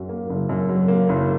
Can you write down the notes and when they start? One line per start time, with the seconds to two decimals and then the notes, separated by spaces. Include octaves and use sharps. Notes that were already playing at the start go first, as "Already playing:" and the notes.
Already playing: F#2 F#3
0.09 A#3
0.29 F#1
0.49 F#2
0.69 F#3
0.88 A#3
1.09 F#1